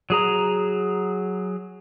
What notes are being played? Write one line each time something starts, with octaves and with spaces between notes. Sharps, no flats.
F#3 G#4 A#5